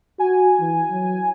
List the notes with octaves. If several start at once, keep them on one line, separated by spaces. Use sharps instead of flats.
F#4 G#5
E3
F#3